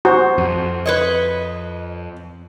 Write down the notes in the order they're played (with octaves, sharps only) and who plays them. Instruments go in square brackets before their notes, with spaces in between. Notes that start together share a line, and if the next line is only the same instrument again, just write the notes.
[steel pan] F#4 [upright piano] C5
[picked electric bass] F2
[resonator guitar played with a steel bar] B4 C#5 D#5